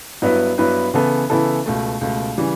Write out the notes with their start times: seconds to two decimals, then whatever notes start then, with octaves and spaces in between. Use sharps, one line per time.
0.22 G2 F#3 B3 E4 B4
0.58 G2 F#3 B3 E4 B4
0.94 C#3 E3 B3 E4 A4
1.30 C#3 E3 B3 E4 A4
1.66 C#2 B2 A3
2.01 C#2 B2 A3
2.38 C#3 E3 G3